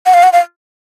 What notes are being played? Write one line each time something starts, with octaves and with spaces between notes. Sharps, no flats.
F#5
F5
F#5
F5